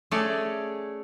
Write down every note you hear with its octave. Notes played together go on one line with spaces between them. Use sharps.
A3 C#4 G#4 C#5 D5